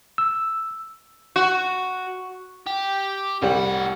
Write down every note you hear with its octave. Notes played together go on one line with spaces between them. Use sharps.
E6
F#4
G4
C2 A2 G3 F#5